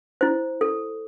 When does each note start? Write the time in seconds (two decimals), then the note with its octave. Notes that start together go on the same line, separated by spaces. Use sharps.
0.21 E4 C5
0.61 A4